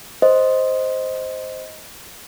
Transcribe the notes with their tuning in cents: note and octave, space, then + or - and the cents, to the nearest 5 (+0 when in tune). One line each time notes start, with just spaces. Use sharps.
C5 +0 D#5 +5